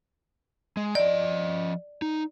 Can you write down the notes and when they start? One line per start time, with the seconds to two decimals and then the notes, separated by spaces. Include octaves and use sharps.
0.77 G#3
0.95 F3 D5 D#5
2.02 D#4